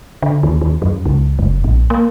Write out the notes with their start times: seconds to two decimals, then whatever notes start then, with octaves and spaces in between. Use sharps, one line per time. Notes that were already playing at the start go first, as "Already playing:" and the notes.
0.22 D3
0.43 D#2
0.61 D#2
0.82 F#2
1.06 C#2
1.39 F#1
1.64 A#1
1.90 A#3